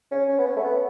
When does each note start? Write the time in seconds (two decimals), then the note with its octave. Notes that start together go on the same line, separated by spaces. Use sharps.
0.11 C#4
0.29 C#4
0.38 B3
0.46 C#4
0.57 A3
0.64 B3